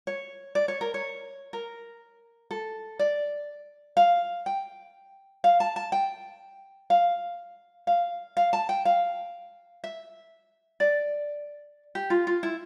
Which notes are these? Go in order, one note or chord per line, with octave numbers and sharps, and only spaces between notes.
C#5
D5
C#5
A#4
C#5
A#4
A4
D5
F5
G5
F5
A5
A5
G5
F5
F5
F5
A5
G5
F5
E5
D5
G4
F4
F4
E4